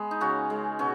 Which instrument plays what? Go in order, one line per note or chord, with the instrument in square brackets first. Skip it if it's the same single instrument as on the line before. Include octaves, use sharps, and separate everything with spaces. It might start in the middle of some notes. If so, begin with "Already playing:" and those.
Already playing: [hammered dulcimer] G#3 B3
D#4
C#3 C#4 F#4
G#3
B2 C#4 F#4